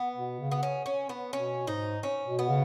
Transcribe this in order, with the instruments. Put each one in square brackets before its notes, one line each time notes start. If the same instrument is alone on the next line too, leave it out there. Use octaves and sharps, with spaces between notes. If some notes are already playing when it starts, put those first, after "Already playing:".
Already playing: [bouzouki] B3
[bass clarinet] B2
C#3
[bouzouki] B3
C#4
C#4
B3
[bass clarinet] B2 [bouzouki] C#4
[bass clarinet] G#2 [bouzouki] D#4
[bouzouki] C#4
[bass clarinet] B2
[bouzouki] B3
[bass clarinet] C#3